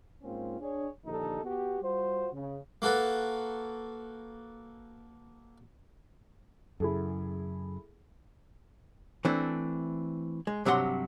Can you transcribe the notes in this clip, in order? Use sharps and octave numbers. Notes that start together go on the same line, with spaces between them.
G#2 A#3 C4 C#4 F4
D4 G#4 C#5
A#1 D3 D#3 D#4 G4 A4
B3 F#4 G4
G3 F4 F#4 C5
C#3
A#3 F#4 A4 B4
F#2 C#3 E4 G#4 A4
E3 A3 C4 D4
G#3
G2 C3 F#3 A#4 F#5 C6